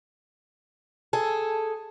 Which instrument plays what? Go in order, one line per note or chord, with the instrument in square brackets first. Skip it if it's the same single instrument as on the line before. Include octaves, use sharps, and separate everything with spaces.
[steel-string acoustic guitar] G#4 A4